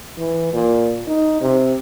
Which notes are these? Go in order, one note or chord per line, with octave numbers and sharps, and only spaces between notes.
E3
A#2
D#4
C3